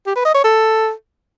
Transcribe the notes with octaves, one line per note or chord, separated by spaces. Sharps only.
G4
B4
D#5
C#5
A4